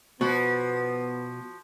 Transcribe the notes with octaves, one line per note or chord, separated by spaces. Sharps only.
B2 F3 B3 F#4